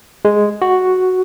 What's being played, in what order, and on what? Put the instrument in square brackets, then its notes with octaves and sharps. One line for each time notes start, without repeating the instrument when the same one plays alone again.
[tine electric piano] G#3
F#4